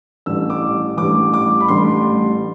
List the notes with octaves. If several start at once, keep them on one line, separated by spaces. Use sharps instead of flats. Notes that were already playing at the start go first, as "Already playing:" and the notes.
A1 A2 G3 D4 E6
D6
A1 A2 G3 D4 D6
D6
B5
A1 A2 G3 D4 C6